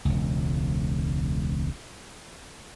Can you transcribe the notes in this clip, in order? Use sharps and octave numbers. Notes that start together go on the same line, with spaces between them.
E1 C#2